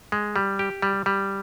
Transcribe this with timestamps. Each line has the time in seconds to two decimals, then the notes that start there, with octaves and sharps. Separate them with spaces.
0.12 G#3
0.36 G3
0.59 G4
0.82 G3
1.06 G3